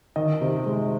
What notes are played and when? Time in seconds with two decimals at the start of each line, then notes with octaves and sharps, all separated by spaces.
0.16 D#3 D#5
0.41 C3
0.66 G#3